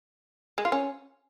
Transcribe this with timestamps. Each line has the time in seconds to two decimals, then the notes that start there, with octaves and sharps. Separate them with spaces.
0.58 G#3
0.65 F4
0.72 C#4